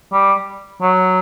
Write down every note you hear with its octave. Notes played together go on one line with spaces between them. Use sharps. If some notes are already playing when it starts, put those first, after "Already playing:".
G3
F#3